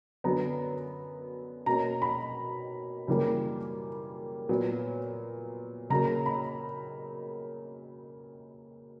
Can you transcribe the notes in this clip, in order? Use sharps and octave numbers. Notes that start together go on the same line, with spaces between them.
F#2 D3 F#3 B3 A#5
B2 A#3 C#4 A#5
B5
F#2 C#3 E3 G3 A#3
A#2 F#3 B3
C#3 F#3 A#3 A#5
B5